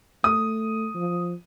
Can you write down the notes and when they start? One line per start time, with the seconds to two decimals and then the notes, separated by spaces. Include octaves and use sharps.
0.24 A3 D#6
0.95 F3